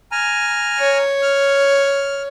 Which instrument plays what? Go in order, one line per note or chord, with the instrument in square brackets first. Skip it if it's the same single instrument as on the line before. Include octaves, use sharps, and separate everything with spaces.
[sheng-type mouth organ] G#5 A#5 F6
[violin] C#5
[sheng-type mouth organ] F6